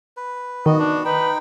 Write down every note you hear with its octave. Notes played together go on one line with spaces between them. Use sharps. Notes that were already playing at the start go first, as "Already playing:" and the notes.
B4
D#3 B3 F#4 D#5
D4
D#4 B4 G5